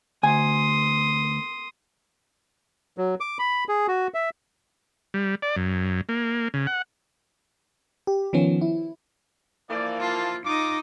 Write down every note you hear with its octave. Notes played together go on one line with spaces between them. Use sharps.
D2 G#5 C6 D#6
F#3
D6
B5
G#4
F#4
E5
G3
D5
F#2
A#3
C#3
F#5
G4
D#3 F3 B3 C#4
E4
E3 F3 A#3 D5
F4 A5 C6
D#4 F4 D#5 D6